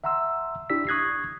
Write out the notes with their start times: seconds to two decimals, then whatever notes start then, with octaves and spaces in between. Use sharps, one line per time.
0.04 E5 F#5 A#5 C6 E6
0.70 D4 E4 G4 D5 E6 B6
0.87 C#6 D#6 F#6 G#6 A#6 C7